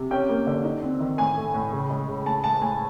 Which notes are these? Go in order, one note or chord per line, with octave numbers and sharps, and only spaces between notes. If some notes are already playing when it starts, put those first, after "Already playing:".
Already playing: C3
C#4 G5
A#3
D3
D#4
C4
D#3
A2 G#5
A3
A2
C#3
G#3
C#3
A2 A5
G#3 A5
A2 G#5